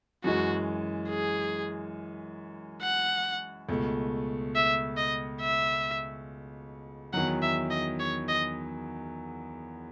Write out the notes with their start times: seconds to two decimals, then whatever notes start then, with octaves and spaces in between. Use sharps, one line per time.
0.24 F#2 E3 G#3 F#4
1.10 G#4
2.83 F#5
3.69 C#2 B2 A3
4.55 E5
4.97 D#5
5.41 E5
7.13 E2 D#3 F#3 F#5
7.42 E5
7.70 D#5
8.00 C#5
8.29 D#5